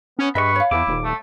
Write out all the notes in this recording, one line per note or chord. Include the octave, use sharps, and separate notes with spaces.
B3 C#4
G2 G#4 B4 D#5 E5 B5 C#6
C#5 F5
E2 E4 D6
D#1
A3